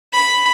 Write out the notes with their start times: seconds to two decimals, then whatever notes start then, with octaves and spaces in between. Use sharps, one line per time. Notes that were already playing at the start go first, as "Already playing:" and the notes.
0.13 B5